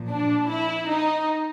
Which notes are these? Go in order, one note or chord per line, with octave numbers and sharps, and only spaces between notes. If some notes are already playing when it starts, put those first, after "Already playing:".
Already playing: A#2 F3
D4
E4
D#4